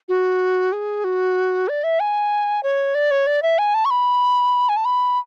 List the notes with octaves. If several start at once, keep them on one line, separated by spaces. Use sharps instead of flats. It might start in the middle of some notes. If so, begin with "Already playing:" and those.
F#4
G#4
F#4
D5
E5
G#5
C#5
D5
C#5
D5
E5
G#5
A5
C#6
B5
G#5
A5
B5